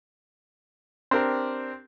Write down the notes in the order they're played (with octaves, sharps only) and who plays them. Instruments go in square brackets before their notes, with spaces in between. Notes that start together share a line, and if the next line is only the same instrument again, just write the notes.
[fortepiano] C4 D4 G4 A#4